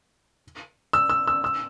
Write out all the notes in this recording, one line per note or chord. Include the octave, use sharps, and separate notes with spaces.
E6
E6
E6
E6